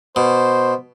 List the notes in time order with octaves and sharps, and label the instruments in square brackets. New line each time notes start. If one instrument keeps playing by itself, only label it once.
[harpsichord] B2 [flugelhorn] C5